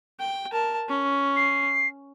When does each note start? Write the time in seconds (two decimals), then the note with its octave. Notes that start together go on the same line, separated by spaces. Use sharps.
0.20 G5
0.52 A#4 A5
0.88 C#4
1.36 C7